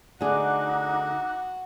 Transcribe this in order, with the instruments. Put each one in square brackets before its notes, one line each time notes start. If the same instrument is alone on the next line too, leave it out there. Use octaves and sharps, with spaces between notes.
[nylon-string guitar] D3 A3 G#4 [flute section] D#4 D6 F#6 [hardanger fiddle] F#4